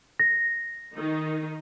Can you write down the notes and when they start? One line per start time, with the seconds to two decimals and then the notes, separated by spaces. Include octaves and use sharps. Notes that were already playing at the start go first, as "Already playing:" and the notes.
0.20 A#6
0.95 D#3 D#4